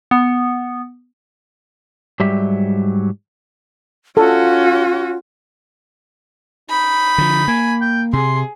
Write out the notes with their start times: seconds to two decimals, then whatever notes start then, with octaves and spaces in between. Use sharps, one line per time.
0.11 B3
2.20 G#2 F#3 G3 G4 E5
4.17 C#4 F4 F#4 A4
6.70 D#4 B5
7.18 D3 F3
7.48 A#3 G#5
7.81 G5
8.13 C3 G#4 C6